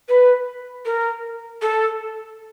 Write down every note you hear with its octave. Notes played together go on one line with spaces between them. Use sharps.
B4
A#4
A4